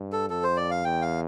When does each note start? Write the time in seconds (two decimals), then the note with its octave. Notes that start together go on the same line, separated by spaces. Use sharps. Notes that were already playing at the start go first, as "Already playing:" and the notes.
Already playing: G2
0.13 A4
0.29 F2 A4
0.43 C5
0.56 D5
0.70 F5
0.84 E2 G5
1.02 F5